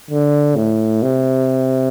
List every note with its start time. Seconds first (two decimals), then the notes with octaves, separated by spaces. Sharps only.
0.10 D3
0.56 A2
1.03 C3